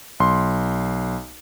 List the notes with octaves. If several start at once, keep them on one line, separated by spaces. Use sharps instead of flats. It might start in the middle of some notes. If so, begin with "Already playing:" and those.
B1 C6